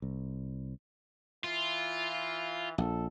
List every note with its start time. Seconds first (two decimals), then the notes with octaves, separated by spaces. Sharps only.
0.02 C2
1.44 E3 F4
2.78 A#1 A4